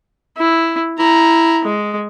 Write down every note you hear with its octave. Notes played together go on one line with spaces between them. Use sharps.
E4
E4 A#5
G#3